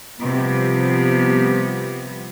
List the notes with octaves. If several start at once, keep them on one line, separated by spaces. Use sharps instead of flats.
C3 F3 G3 B3